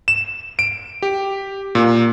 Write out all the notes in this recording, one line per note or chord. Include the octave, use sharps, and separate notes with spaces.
E7
D7
G4
A#2